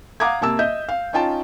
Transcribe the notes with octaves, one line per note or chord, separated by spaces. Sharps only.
F5 F#5 A#5 D6 D#6 G#6
C3 A#3 A5 E6
D#5 E5 G6
F5
C#4 D#4 F4 G5 A5